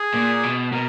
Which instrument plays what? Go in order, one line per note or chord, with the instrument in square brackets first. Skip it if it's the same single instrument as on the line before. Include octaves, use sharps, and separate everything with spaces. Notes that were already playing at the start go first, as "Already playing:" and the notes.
Already playing: [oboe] G#4
[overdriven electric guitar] A#2
B2
[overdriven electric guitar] B2 [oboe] A#4